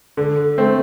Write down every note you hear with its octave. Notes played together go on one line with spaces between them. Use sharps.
D3
A3 C4